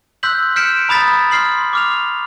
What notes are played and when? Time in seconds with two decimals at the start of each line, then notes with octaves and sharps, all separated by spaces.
0.23 C6 E6 F#6 G6 B6 F#7
0.56 F6 G6 B6 C#7 D7 E7
0.89 A#5 B5 D#6 G#6 A6 B6
1.31 C6 F6 C7 F#7
1.73 D6 F6 F7